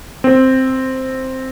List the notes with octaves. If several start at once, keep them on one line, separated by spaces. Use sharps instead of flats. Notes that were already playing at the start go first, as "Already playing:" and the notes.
C4